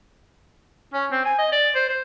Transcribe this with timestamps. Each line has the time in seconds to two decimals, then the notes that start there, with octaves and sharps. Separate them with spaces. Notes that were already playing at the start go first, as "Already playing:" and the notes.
0.93 C#4
1.11 C4
1.25 G#5
1.38 D#5
1.52 D5
1.75 C5
1.89 C5